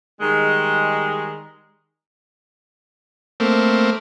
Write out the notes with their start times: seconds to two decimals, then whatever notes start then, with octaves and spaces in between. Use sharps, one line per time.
0.21 D#3 G3 G#3
3.40 A3 A#3 C4